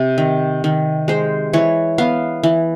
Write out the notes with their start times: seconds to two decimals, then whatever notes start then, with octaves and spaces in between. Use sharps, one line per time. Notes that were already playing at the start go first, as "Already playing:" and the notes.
Already playing: C3
0.18 D#3
0.64 D#3
1.08 G#3 C5
1.53 E3 C#5
1.98 B3 F5
2.43 E3